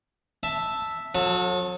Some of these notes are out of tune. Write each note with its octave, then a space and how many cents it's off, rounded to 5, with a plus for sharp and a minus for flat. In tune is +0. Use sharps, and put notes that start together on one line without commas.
E5 +0 A5 +0
F#3 -40 A4 +0